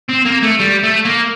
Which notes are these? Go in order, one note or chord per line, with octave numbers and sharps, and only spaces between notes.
C4
A#3
A3
G3
A3
A#3